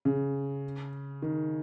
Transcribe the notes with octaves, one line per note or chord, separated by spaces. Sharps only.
C#3
D#3